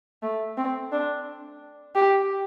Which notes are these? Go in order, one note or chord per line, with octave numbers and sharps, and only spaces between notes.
A3
C4
D4
G4